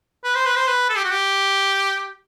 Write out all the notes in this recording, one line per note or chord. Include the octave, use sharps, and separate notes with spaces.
B4
C5
B4
C5
B4
A4
G4
F#4
G4